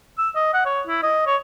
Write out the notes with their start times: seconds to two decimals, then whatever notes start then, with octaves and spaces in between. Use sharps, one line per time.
0.18 E6
0.35 D#5
0.54 F#5
0.65 C#5
0.87 E4
1.03 D#5
1.27 C#5